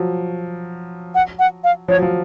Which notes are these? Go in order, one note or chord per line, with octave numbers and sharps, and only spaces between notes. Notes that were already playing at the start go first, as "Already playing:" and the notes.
Already playing: F3 F#3
F#5
F#5
F5
F3 C#5
F#3
F3